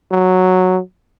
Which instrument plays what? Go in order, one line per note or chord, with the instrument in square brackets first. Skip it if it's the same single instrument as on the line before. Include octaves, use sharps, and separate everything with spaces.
[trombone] F#3